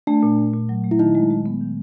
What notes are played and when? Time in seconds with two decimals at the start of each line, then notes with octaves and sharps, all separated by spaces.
0.07 A3 D4
0.23 A#2
0.38 A3
0.54 A#2
0.69 F#3
0.84 A3
0.91 E4
0.99 D#3 D#4
1.15 G#3
1.30 G#3
1.46 B3
1.61 D#3